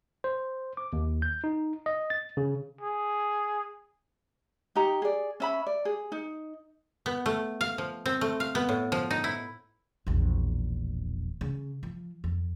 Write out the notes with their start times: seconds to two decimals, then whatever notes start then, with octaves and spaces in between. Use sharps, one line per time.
0.24 C5
0.77 D6
0.93 D#2
1.22 G6
1.44 D#4
1.86 D#5
2.10 A6
2.37 C#3
2.81 G#4
4.75 D#4 G4 A#5
5.02 G#4 D5
5.40 C#4 E5 B5
5.66 D5
5.85 G#4
6.12 D#4
7.06 B3
7.26 A3
7.61 F5
7.78 F3
8.06 C4
8.21 A3
8.40 F5
8.55 B3
8.69 A2
8.92 F3
9.11 D#4
9.24 E4
10.07 E1 A#1
11.41 C#3
11.83 F3
12.24 F2